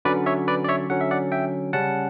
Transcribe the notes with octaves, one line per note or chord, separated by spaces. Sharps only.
D3 F#3 C#4 B4 D5
C#5 E5
B4 D5
D5
C#5 E5
D3 F#3 C#4 F#5
E5
D5 F#5
E5 G5
C#3 G3 C#4 F#5 A5